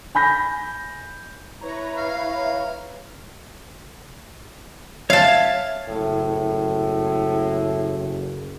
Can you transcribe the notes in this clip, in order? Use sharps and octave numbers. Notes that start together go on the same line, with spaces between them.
G#5 B5 G6 A#6
E4 B4 C#5 A#5
F5
C#5 E5 F5 A5 F6
F#1 A2